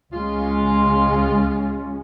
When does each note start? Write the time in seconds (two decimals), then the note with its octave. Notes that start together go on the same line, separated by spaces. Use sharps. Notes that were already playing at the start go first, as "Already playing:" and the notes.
0.13 C#2 G#3 C#4 F4